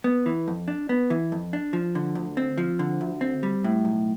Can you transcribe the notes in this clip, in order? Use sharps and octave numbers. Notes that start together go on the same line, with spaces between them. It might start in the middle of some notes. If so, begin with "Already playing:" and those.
B3
E3
F2
D4
B3
E3
F2
D4
F3
D3
D2
C4
F3
D3
D2
C4
G3
A2
B1